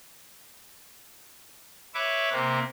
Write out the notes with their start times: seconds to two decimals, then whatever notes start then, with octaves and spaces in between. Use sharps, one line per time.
1.94 B4 C#5 E5 D6
2.32 C3 A#3 C4